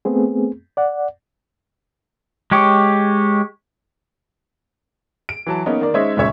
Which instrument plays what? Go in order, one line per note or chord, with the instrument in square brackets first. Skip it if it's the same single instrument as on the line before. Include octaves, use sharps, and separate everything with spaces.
[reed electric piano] A3 B3 C4 G#4
D5 F#5
[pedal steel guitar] G#3 G4 C#5
[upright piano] D7
E3 F#3 A5
A#3 B3 C#4 D#4
D#3 A#3 D5
G#3 C#4 D#4 C5 C#5 E5
D#1 C#2 C#4 C#5 E5